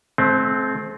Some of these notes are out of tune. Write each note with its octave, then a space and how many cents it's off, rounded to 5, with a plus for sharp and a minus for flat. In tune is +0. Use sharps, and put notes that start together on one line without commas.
A3 -40 C4 +0